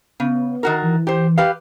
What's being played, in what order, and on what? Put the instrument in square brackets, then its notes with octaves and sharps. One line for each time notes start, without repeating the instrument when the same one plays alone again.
[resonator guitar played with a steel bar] C#3 [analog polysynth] B3
[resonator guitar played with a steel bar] D#3 F#4 A#4
[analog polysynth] E3
[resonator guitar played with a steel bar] G4 C5
G4 B4 F5